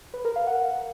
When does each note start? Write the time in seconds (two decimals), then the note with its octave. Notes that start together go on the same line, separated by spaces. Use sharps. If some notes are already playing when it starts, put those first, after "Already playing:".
0.14 B4
0.25 A#4
0.36 F5
0.47 F#5